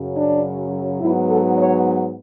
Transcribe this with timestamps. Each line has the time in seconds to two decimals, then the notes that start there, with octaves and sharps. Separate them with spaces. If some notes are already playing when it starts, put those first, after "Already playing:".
Already playing: F#2 C#3 F#3
0.15 D4
1.01 G#2 F#3 B3 E4
1.30 A4
1.58 C#5